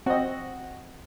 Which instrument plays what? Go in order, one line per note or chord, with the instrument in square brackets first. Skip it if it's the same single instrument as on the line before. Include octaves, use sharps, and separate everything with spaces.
[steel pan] C4 [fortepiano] F#4 D#5